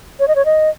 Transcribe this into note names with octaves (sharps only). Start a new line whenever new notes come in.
C#5
D#5
C#5
D#5